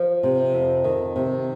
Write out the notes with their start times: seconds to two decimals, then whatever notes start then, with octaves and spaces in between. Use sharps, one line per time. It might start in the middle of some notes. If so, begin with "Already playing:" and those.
Already playing: F3
0.23 C3
0.53 F2
0.84 D#3
1.16 C3